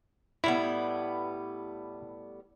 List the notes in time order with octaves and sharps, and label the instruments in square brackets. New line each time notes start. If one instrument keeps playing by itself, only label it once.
[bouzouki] A2 G3 B3 [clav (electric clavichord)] E4